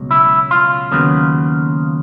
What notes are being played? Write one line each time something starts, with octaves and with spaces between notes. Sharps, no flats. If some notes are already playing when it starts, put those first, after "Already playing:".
Already playing: C#2 B2 F#3
E4
F4
D#2 C#3 F#3 B3